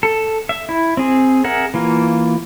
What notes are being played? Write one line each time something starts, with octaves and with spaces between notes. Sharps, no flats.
A4
E5
E4
C4 G#4
G#4 A#4 E5 F#5
E3 A#3 F4